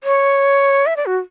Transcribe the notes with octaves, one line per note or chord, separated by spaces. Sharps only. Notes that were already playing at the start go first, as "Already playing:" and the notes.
C#5
E5
D5
F#4